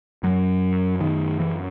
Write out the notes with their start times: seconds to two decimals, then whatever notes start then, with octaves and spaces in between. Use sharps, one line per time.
0.23 F#2 F#3
1.01 D#3
1.40 E3